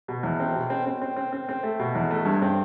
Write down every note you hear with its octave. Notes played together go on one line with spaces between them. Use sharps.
B2
E2
C4
B2
C4
C4
C4
C4
C4
C4
A3
B2
E2
A3
G2
C4